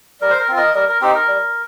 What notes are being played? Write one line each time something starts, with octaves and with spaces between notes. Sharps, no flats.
G3 A#4
C5
A#4
C4 F4
A#4 D#5
G3 A#4
A#4
C4 D#4 G4
A#4
G3